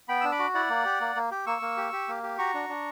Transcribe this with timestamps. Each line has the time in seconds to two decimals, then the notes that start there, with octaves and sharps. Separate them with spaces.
0.09 B3 G5 B5
0.21 D4 E6
0.32 B5 D6
0.39 F#4
0.54 E4 D5 F#5
0.70 A#3
0.85 G4
1.01 A#3
1.16 A#3
1.31 G4
1.46 A#3 C#6 E6
1.62 A#3
1.77 G4
1.93 G4
2.08 A#3
2.23 G4
2.38 F#4 A#5 C#6
2.54 D4
2.69 D4